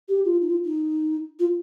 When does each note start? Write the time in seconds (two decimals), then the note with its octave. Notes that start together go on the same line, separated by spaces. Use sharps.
0.09 G4
0.25 F4
0.41 D#4
0.50 F4
0.65 D#4
1.39 F4